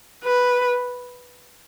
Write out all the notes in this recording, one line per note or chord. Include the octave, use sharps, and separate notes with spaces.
B4